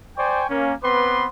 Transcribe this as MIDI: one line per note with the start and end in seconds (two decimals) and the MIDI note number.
0.17 0.45 72
0.17 0.45 74
0.17 0.45 79
0.17 0.45 80
0.17 0.45 85
0.50 0.73 58
0.50 0.73 61
0.83 1.27 59
0.83 1.27 60
0.83 1.27 71
0.83 1.27 84
0.83 1.27 86